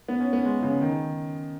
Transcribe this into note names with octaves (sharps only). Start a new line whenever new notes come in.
B3
C#4
B3
G#3
C#3
D#3